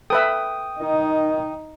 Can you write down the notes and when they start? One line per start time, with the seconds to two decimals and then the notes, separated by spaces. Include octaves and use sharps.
0.10 A4 B4 E5 G5 D#6
0.80 D#3 D#4